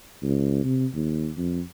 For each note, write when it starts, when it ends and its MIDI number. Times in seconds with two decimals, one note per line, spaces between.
0.22 0.63 37
0.65 0.86 48
0.94 1.30 39
1.37 1.61 41